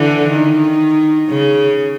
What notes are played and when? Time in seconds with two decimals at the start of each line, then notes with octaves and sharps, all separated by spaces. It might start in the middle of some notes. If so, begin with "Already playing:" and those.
Already playing: D3 E3
0.29 D#3
1.29 C#3